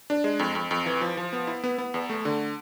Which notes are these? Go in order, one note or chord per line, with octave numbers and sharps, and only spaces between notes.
D4
G#3
F2
F2
F2
E3
F3
F3
B3
E4
B3
B3
E2
A3
D3